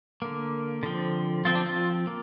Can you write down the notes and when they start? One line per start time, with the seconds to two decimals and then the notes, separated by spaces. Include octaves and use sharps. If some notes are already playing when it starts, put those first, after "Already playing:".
0.22 D3 A#3
0.83 D3 F3 C4
1.45 F3 C4 F4
1.55 D4
1.66 F4
2.07 A#3